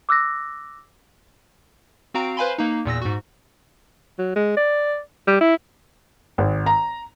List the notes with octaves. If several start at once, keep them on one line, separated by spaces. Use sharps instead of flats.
D6 E6 F#6 A#6
C4 F#4 F5 A#5 D7
B4 C5 F5 G#5 B5 C6
A#3 D#4
E2 A#2 E6 A#6
G#2 F#4
F#3
G#3
D5
G3
E4
G#1
A#5